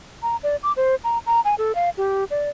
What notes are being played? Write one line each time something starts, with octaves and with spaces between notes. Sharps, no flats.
A#5
D5
D6
C5
A#5
A#5
G#5
A4
F5
G4
D5